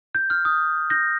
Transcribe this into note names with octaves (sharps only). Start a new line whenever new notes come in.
G6
F6
D#6
G6 A#6